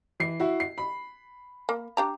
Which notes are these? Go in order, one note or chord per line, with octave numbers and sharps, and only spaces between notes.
E3 C7
E4 F#4
C7
B5
A#3
D4 G4 A#5